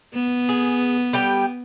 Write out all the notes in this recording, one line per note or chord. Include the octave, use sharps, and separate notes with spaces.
B3
G#4
G3 G4 G5